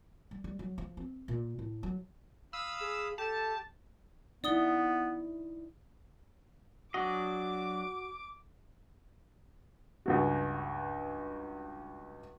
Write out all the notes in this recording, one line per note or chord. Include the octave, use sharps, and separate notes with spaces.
G3
G3
F#3
F3
C4
A#2
A2
F#3
F5 B5 D#6 E6
G#4
G4 A4 A5
B3 D#4 E4 D5 D#6 G7
F#3 D4 F#4 D#5 D6
C#2 G2 F#4